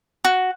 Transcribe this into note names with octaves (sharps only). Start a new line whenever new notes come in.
F#4